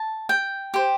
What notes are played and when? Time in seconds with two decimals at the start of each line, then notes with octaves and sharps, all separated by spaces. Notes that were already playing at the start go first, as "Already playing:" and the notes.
Already playing: A5
0.29 G5
0.74 G4 C5